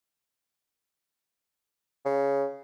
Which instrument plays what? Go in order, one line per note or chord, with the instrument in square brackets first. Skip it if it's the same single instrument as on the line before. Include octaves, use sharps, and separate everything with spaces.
[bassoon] C#3